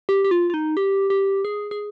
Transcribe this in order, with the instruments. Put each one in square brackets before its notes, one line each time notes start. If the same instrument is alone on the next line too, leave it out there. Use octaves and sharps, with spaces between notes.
[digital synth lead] G4
G4
F4
F4
D#4
G4
G4
G#4
G#4